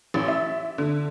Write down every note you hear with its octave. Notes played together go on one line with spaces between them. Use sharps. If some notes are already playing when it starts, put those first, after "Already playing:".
A1
E5
D3